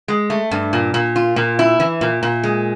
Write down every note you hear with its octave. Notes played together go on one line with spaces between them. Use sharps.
G#3
A3
G2
A#2
A#2
F4
A#2
E4
E3
A#2
A#2
G#3